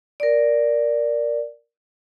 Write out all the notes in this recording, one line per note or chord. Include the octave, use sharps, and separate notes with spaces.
A#4 D5